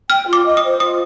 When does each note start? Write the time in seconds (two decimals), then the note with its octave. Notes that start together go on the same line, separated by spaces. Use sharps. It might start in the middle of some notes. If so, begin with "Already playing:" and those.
0.10 G5 F6
0.27 F4
0.33 D6
0.45 D#5
0.57 D#6
0.63 C5
0.80 F4 D#6